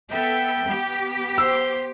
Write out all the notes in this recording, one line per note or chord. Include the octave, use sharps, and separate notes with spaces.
B3 A4 E5 G5
B3 G4
C5 C6 E6